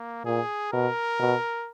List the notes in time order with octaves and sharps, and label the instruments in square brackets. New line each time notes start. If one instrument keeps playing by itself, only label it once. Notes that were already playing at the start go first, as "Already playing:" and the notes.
Already playing: [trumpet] A#3
[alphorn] A#2 [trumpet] G#4
[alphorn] B2 [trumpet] A#4
[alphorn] B2